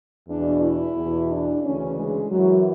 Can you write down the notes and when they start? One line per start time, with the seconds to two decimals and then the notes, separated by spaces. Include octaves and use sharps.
0.28 E2 D4
0.33 B2
0.62 E4
0.96 E2 B2
1.30 D4
1.63 D2 C#3 E3 C#4
1.97 G#3
2.31 F#2 E3 F#3